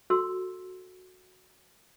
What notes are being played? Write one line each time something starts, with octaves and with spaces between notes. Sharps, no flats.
F#4 A4 C6 E6